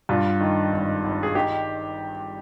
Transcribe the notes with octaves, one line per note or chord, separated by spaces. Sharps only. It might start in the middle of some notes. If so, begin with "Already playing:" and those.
G2 F4
D#3
G#1
G#1
G#4
D#3 G4